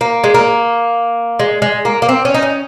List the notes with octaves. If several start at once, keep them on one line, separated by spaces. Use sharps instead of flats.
A#3
G#3
A#3
G#3
G#3
A#3
A#3
C4
C#4
D#4
C#4